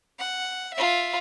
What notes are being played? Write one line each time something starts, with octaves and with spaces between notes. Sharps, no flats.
F#5
F4 E5